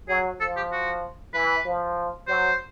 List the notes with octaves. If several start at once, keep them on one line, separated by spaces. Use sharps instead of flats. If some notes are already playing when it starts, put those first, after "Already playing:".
F#3 G#4
F3 A4
G4
F#4
E3 B4
F3
F#3 C5